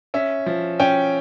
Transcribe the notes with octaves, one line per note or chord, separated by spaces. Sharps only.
C#4 E5
F3
C#4 G5